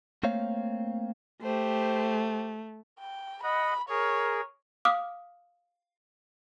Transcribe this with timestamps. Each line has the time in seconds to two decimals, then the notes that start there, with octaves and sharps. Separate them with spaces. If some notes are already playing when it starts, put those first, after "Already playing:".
0.23 A3 A#3 C4 C#5 F5
1.42 A3 G4 C5
2.99 G5
3.43 D#5 F#5 B5
3.89 G#4 A#4 C#5
4.85 F5 D6 D#6 F6